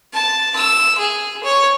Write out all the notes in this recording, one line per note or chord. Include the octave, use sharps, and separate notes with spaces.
A5
E6
G#4
C#5